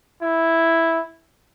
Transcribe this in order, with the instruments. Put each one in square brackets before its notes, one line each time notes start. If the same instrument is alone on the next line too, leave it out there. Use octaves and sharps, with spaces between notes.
[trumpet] E4